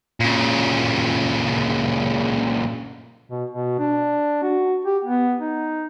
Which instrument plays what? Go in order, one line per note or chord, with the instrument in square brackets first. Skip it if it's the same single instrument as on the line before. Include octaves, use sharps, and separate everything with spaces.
[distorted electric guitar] A#2 C#3
[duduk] B2
B2
D4
F#4
G4
B3
D#4